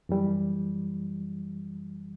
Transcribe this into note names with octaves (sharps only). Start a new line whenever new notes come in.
F#2 E3 G3